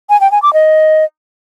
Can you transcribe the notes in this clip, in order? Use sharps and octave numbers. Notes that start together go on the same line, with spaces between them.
G#5
G5
G#5
D6
D#5